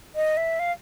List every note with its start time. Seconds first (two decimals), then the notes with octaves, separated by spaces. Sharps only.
0.15 D#5
0.37 E5
0.59 F5